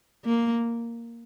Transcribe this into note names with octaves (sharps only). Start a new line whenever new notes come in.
A#3